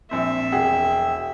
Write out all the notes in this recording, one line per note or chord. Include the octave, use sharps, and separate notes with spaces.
A#1 C4 E5
E1 G#4 F#5 G5